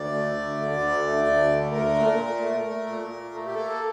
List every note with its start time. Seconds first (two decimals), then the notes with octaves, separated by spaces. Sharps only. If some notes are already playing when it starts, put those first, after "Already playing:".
Already playing: D2 D5
0.12 A3
0.35 D2
0.58 D3
0.81 D2
1.04 A3
1.26 D2
1.49 D3
1.72 A3 A#4
1.95 A#2
2.17 A#2
2.41 A3
2.63 A3
2.86 A#2
3.09 A#2
3.32 A3
3.46 G4
3.55 A#3 A4